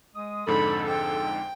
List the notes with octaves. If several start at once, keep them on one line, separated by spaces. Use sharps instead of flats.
G#3 D#6
F2 G#2 D3 A4 B5
G5